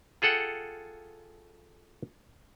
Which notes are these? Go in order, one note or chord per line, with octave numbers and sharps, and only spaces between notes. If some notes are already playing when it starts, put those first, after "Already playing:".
F4 G#4 A4 F#5 G5